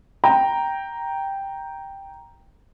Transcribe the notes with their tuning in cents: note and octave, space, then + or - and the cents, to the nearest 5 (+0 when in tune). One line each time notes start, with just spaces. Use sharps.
G5 +0 A#5 +0